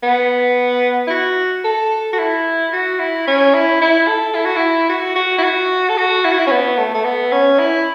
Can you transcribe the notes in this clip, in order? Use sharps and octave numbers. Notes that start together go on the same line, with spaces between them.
B3
E4
F#4
A4
F#4
E4
F#4
E4
C#4
E4
E4
A4
E4
F#4
E4
F#4
F#4
E4
F#4
A4
F#4
E4
F#4
E4
C#4
B3
A3
A3
B3
C#4
E4